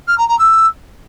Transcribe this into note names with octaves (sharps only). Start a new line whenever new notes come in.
F6
A#5
A#5
E6